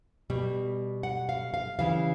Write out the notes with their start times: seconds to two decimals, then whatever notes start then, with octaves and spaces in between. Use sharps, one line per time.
0.30 B2 G3
1.03 F#5
1.29 F5
1.54 F5
1.79 C#3 E3 G3 F5